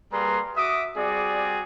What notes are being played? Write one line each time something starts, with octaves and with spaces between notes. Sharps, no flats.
G3 A#3 G#4 B4 A#5 C6
F#4 E5 D6 D#6
G3 C4 F#4 G#4 D5